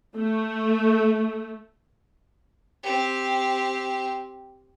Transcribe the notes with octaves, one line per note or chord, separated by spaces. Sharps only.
A3
C4 G4